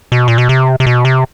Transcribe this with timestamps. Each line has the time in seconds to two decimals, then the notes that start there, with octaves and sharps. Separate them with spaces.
0.12 B2
0.28 A#2
0.38 B2
0.49 C3
0.80 C3
0.86 B2
1.05 C3